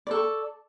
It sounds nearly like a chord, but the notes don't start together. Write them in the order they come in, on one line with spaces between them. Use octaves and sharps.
D5 A4 C#6